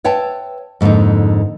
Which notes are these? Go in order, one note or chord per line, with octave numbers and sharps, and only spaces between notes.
B4 C#5 E5 G5 A5
F2 G#2 D3 A#3 D#4